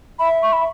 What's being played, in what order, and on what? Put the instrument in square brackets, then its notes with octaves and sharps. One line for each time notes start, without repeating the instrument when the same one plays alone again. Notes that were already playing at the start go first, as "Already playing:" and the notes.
[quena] E5 [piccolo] B5
[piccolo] C#6
B5